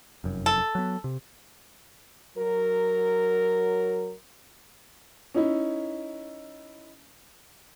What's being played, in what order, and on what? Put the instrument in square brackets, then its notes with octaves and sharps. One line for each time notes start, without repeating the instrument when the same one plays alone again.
[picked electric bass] F1 F#2
[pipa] A4
[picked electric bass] F#3 B3
C3
[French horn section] F#3 A#4
[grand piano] C#4 D#4 E4